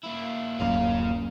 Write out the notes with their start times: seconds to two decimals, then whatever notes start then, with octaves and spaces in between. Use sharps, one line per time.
0.03 A#3 E4
0.60 D1 F#2 A#3 C#4 F5